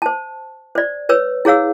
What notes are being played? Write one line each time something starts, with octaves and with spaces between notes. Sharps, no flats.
C5 A5
C5 D5
B4 C#5 E6
E4 G#4 C#5 F5 E6